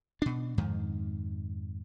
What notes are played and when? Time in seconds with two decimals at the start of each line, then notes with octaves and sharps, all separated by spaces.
0.22 B2 D4
0.58 F2 G#2 D#3